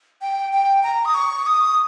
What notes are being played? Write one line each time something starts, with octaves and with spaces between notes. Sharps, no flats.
G5
G5
A#5
D#6
C#6
D#6